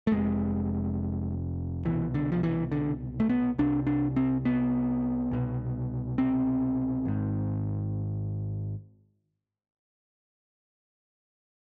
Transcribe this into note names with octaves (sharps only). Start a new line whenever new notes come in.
A3
F1 F2 C3 G#3
C2 B2 E3
D3
F3
E3
D3
A3
B3
C2 C3 D4
D4
C4
B3
C2 B2
C4
G#1 G#2